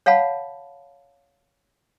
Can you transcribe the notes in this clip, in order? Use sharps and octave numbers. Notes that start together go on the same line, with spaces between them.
C#5 F5 F#5 A5 B5